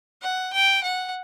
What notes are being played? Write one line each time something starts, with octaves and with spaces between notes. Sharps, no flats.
F#5
G5
F#5